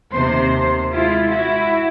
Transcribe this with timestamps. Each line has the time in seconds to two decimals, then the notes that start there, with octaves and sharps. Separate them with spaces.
0.13 D#2 C3 C5
0.92 G#3 E4 F4
1.30 E4 F#4